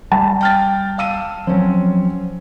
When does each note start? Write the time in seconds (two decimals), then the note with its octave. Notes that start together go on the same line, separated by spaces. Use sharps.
0.12 G3 A5
0.41 G5 F6 A6
0.98 F5 E6 D#7
1.47 F3 F#3 C4 C#4